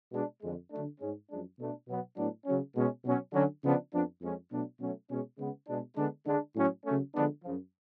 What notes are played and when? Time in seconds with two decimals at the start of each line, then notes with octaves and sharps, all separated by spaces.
0.12 B2 G#3 D4
0.41 F2 D3 G#3
0.71 D3 F#3 A3 D4
1.00 G#2 G#3 C#4
1.29 F#2 F3 G#3 D4
1.59 B2 A3 D4
1.87 B2 F#3 B3
2.16 A2 F#3 B3 D4
2.46 C#3 F#3 C#4
2.75 B2 G#3 C#4
3.04 B2 F#3 C#4
3.33 D3 F#3 C#4
3.62 C#3 F3 B3 D4
3.92 F2 F3 B3 D4
4.21 F2 F3 G#3 C#4
4.51 B2 F#3 A3 D4
4.80 B2 F#3 A3 C#4
5.09 B2 G#3 C#4
5.39 C#3 G#3 B3
5.67 B2 G#3 D4
5.96 D3 G#3 B3 D4
6.26 D3 G#3 D4
6.55 A2 F#3 C#4
6.84 C#3 F#3 A3 C#4
7.14 D3 F3 G#3 B3 D4
7.43 F#2 C#3 F3